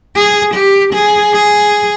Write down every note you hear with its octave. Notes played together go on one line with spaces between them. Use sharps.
G#4
G4
G#4
G#4